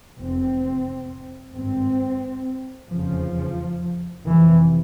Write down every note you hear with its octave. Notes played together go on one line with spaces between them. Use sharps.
F1 E2 C3 C4
G#1 G2 C4
F1 E2 C#3 F3
F1 F2 C3 E3